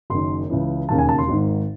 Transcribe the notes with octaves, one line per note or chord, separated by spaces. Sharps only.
F#1 F#2 D#3 C6
C#2 C#3 E3
E1 D#2 C#3 A5
G#5
A5
C6
G#1 G#2 D#3